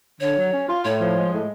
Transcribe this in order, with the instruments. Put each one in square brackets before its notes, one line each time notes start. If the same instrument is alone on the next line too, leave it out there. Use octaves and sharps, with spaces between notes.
[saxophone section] D3 [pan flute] C#5
[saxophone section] F#3
C#4
F4
[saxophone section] A2 [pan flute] C#5
[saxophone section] F3
G#3
A2